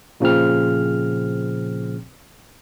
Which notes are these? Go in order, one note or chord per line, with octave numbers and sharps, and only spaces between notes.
A#2 C#3 F3 C4 F6